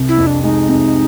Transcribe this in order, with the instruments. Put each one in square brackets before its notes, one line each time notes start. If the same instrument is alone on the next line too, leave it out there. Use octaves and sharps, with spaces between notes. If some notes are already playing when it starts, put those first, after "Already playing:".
Already playing: [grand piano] C2 C3
[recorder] E4
[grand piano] F2
[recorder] D4
[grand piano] G#3 [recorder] D#4
[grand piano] C3